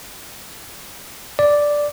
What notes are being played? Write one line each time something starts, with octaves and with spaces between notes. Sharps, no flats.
D5